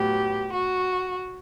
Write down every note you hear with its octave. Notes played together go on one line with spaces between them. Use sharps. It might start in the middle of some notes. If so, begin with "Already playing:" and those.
Already playing: A2 F#3 B3 G4
F#4